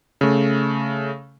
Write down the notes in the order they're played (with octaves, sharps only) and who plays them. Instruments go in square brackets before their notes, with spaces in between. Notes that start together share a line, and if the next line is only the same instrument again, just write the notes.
[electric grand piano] C#3 A3